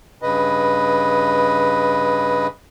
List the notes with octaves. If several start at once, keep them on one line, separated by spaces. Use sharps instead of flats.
G2 C#3 B4 D#5